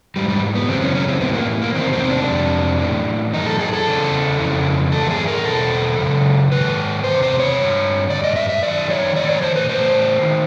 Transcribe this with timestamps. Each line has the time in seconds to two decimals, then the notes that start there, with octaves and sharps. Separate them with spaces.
0.16 G#2 E3 G3
0.29 G3
0.55 B3
0.68 F#2 C#3 E3 C4
0.81 C#4
0.95 C#4
1.08 C4
1.21 A2 E3 B3
1.34 A#3
1.62 A#3
1.74 E2 C3 D#3 C4
1.93 C4
2.10 D4
2.28 F2 C3
2.80 A2 E3
3.33 F#2 D#3 D#4
3.46 A4
3.59 G#4
3.73 A4
3.86 E2 C#3 E3
4.39 F2 C#3 E3
4.92 G#2 E3 A4
5.11 G#4
5.28 A#4
5.45 E2 B2 A4
5.98 F#2 C#3
6.52 G#2 D#3 B4
7.04 E2 C3 C5
7.22 C5
7.40 C#5
7.58 G2 D3
8.10 G2 D#3 D5
8.24 D#5
8.36 E5
8.49 E5
8.63 F#2 D#3 D5
8.90 C#5
9.16 A2 E3 D5
9.29 C#5
9.42 C5
9.56 B4
9.69 A2 E3 C5
10.22 D#3